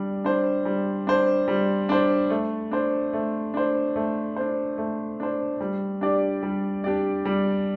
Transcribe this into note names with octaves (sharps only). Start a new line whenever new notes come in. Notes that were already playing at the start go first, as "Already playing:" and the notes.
Already playing: G3 D4
D4 C5
G3
D4 C5
G3
D4 C5
A3
D4 C5
A3
D4 C5
A3
D4 C5
A3
D4 C5
G3
D4 G4 D5
G3
D4 G4 D5
G3